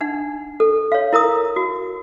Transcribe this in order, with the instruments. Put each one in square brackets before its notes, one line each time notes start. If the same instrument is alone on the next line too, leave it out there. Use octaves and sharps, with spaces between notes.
[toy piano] D4 D#4 F#5
A4
C#5 F5
E4 A#4 A#5 D#6
F#4